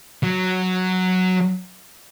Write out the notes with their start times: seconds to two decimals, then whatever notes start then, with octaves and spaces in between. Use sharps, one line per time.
0.24 F#3